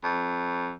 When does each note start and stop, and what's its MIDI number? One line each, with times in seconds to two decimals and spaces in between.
0.04 0.73 41